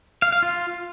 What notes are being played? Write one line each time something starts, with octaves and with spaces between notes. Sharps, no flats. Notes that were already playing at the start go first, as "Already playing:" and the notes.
F5
F5
F4